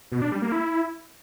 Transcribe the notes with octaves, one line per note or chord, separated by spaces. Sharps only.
B2
D4
G3
A#3
E4